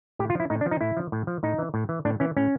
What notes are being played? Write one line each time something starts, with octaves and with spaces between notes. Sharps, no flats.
A2 G4
F4
F3 E4
A2 D#4
D4
F3
D#4
A2 E4
F3
A2
F3
A2 D#4
E3
A2
E3
A2 D4
E3 C#4
A2 C#4